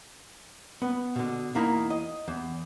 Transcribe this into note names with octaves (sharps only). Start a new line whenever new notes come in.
B3
B2 D3
E2 A#3 D#4 E4 A#4 A#5
D#5
E2